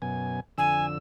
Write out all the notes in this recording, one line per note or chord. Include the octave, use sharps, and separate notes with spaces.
F#2 B2 G#5
F2 D3 G#5 E6